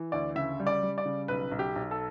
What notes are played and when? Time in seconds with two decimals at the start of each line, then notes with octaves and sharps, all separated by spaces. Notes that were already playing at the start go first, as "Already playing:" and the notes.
Already playing: E3
0.12 D2 D5
0.36 C#3 E5
0.60 G3
0.67 D5
0.83 G3
0.98 D5
1.05 C#3
1.28 B1 B4
1.52 B1
1.59 G4
1.76 B1
1.91 A4